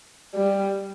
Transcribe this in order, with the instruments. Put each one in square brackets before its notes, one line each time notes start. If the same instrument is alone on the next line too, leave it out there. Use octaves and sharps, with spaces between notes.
[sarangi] G3